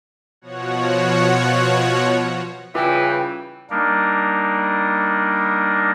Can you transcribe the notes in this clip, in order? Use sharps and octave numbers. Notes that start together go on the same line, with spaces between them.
B2 F3 F#4 C#5 F#5
C#3 E3 G3 F4 G5
G3 A#3 D4 D#4 A#4